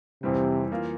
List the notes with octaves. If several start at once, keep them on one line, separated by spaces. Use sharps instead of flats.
F2 C3 E3 G3 C4
E3 A#3 F4